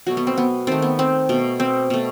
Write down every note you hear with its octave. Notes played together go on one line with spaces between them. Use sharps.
B2 F#3 A3 F#4
B3
C4
B3
D#3 A3 C4
B3
C4
B2 A3
C4
B2 A3